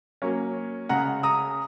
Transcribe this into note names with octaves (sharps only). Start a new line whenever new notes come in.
F#3 A#3 C#4
C#3 G#3 C#4 F#5 A#5
A#5 D#6